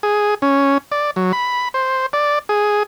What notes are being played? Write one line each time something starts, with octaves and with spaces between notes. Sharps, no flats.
G#4
C#4
D5
F#3
B5
C5
D5
G#4